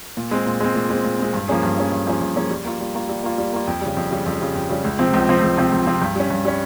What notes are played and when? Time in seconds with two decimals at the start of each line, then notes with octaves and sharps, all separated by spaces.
0.17 A#2
0.31 G#3 C4
0.46 A#2
0.60 G#3 C4
0.75 A#2
0.90 G#3 C4
1.04 A#2
1.19 G#3 C4
1.34 G2
1.48 F3 A#3 C#4 G#4
1.63 G2
1.78 F3 A#3 C#4 G#4
1.92 G2
2.07 F3 A#3 C#4 G#4
2.22 G2
2.36 F3 A#3 C#4 G#4
2.50 G3
2.65 A#3 F4
2.80 G3
2.94 A#3 F4
3.09 G3
3.24 A#3 F4
3.38 G3
3.53 A#3 F4
3.67 F2
3.81 C#3 G3
3.97 F2
4.11 C#3 G3
4.26 F2
4.40 C#3 G3
4.55 F2
4.69 C#3 G3
4.84 C#2
4.99 C3 F3 C4
5.13 C#2
5.28 C3 F3 C4
5.43 C#2
5.57 C3 F3 C4
5.72 C#2
5.86 C3 F3 C4
6.01 G2
6.16 G3 C#4
6.30 G2
6.45 G3 C#4